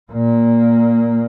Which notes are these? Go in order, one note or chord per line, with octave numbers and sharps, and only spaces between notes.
A#2 A#3